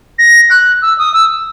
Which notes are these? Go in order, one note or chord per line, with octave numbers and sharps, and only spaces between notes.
A#6
F#6
E6
D#6
E6